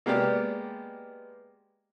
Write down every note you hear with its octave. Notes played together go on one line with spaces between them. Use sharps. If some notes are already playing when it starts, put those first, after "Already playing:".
G#3 A#3 B3 G4 D5